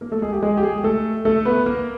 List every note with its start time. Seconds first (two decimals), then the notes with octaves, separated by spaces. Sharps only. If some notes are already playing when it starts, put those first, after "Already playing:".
0.01 A#3 A#4
0.12 A3 A4
0.22 G#3 G#4
0.33 G4
0.42 G#3 G#4
0.57 G4
0.63 G#3 G#4
0.84 A3 A4
1.25 A3 A4
1.45 B3 B4
1.66 A#3 A#4